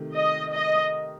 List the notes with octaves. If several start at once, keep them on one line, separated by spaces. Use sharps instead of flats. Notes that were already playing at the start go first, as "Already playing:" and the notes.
Already playing: C3 D#3 A3
D#5
D#5